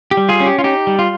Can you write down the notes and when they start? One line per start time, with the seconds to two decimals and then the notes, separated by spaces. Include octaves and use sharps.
0.11 G4
0.17 G3
0.29 F4 G#4
0.40 C#4
0.46 G4
0.59 F4
0.64 D#4 G4
0.87 G3
0.99 F4